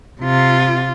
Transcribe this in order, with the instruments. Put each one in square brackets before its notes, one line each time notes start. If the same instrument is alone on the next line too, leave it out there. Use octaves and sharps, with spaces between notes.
[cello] C3 F4